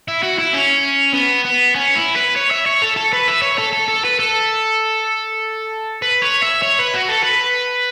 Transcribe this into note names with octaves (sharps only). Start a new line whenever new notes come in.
E4
F#4
E4
C#4
B3
B3
C#4
E4
B4
C#5
E5
C#5
A4
A4
B4
E5
C#5
A4
A4
A4
B4
A4
B4
C#5
E5
C#5
B4
F#4
A4
B4